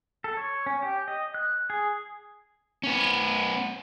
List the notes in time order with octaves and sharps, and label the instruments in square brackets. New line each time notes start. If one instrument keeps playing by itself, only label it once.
[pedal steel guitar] A4
C#5
C#4
G4
D#5
F#6
G#4
[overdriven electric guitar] B3 C#4